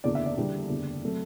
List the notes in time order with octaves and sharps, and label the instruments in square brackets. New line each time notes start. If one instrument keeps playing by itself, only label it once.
[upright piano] F#1 E2 D3 D5
E5
D5
E2 D3 G3 B3 G4
F#1 E2 D3
C3 F#3 A3